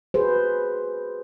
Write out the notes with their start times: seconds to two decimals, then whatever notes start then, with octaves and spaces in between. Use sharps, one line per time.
0.14 F#4 G#4 B4 C5